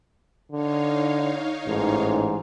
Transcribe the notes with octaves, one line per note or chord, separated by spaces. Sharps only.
D3 D#4 C#5 F5
A1 G#2